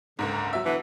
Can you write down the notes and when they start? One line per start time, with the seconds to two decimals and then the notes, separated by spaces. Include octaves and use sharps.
0.19 F#1 C#2 G#2 D3
0.53 F#3 E5
0.66 D3 E3 B3